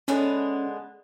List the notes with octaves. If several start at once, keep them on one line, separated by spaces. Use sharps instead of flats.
D3 G#3 B3 C#4